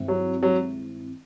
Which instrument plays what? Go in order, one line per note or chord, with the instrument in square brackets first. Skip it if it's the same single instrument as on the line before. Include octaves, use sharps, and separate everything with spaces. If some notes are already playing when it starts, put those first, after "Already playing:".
Already playing: [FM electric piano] G2 D#3 G#3 C4 E4
[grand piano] F#3
F#3